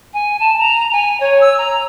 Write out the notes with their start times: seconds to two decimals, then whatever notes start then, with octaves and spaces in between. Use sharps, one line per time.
0.14 G#5
0.40 A5
0.59 A#5
0.92 G#5
1.20 C#5
1.41 E6
1.58 A#5